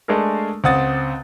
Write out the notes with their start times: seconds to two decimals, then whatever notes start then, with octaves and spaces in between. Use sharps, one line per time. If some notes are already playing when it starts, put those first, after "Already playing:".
0.08 G#3 A3 D4 G#4 A#4
0.64 C#2 C4 F#5 D#6 A6